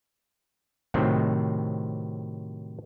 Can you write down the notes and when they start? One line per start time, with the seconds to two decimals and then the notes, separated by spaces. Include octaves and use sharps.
0.94 A2 C3 D#3 F#3 C4